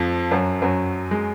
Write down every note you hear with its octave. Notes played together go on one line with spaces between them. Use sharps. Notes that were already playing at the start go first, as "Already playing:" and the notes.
Already playing: F2 F3
F#2 F#3
F#2 F#3
G#3